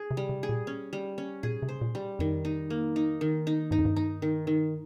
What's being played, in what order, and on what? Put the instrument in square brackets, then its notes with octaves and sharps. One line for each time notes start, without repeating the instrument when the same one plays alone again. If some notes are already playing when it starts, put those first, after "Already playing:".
Already playing: [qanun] G#4
[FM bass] C3
[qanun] G3
[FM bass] C3
[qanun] G#4
[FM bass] A#2
[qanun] C#4
G3
C#4
[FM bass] A#2 [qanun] G#4
[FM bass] C3
[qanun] C5
[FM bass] A#2
[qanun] G3
[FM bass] F2 [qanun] D#3
[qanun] D#4
A#3
D#4
D#3
D#4
[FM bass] G2 [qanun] D#4
[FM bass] F2
G2
[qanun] D#4
D#3
D#3